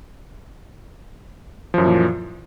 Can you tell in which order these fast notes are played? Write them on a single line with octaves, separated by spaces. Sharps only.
F3 F#2 E3 A#2